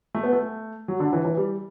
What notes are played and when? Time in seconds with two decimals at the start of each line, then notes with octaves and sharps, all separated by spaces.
0.15 A3
0.23 B3
0.33 A3
0.88 F#3
1.00 D3
1.13 E3
1.25 E3
1.37 G3